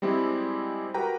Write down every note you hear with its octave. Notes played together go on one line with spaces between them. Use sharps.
G3 G#3 C4 E4 G4 G#4
F#4 G4 A#4 B4 G5 A#5